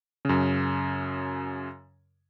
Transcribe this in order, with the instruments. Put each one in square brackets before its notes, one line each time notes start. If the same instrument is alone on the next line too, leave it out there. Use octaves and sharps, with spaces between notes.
[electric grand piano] F#2 C#3